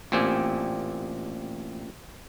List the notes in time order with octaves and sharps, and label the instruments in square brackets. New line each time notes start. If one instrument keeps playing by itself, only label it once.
[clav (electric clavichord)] A1 A#2 C4 G4 G#5